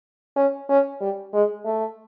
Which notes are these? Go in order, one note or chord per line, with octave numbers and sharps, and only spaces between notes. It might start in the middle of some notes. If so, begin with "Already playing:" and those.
C#4
C#4
G3
G#3
A3